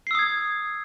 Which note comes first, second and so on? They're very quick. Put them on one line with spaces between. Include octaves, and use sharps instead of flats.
C7 E6 D#6 G#6